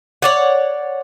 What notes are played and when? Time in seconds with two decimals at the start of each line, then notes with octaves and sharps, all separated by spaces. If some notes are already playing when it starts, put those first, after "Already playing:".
0.22 C#5 D5 F#5